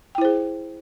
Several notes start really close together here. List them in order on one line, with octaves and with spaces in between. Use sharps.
G5 E4 C5 G#4